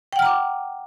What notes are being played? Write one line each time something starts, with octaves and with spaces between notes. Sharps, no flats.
F#5 G5 A#5 D6 F6